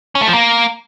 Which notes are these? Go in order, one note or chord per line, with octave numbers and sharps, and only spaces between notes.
C#4
A3
F3
A#3